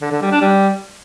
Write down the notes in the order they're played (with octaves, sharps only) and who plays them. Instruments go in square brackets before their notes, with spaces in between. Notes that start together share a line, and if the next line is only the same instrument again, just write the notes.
[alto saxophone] D3
D3
G3
D4
G3